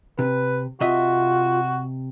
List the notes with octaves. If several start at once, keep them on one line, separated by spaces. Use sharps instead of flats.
C3 B4
C3 F4 F#4 D#5 E5